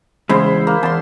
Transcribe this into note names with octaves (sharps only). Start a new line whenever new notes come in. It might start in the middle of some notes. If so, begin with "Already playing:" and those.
E2 C#3 G#3 E4 C5
A#3
E2 A5 C6